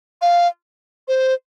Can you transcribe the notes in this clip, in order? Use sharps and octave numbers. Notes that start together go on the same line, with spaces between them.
F5
C5